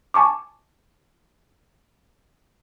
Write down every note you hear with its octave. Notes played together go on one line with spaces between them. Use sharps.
G#5 A5 C#6 D6